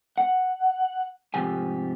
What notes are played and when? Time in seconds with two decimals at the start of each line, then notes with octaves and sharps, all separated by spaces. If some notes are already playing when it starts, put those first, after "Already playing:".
0.18 F#5
1.34 G#2 C3 F3 G4 G#5